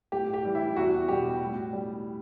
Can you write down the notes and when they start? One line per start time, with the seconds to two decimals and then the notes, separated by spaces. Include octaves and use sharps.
0.12 A2 G4
0.34 G4
0.45 E3 G3
0.55 E4
0.76 E2 F#4
1.08 B2 G3 G4
1.41 A2
1.73 G3